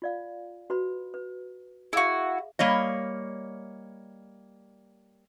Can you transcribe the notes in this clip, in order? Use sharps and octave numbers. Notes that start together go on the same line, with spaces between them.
F4 D5 F5
F#4 B4 B5
B4
E4 F#4 G#4 E5 F5
G3 A#3 C#5 D#5